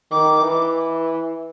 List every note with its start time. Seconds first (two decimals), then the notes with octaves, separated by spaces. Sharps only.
0.11 D#3 D6
0.43 E3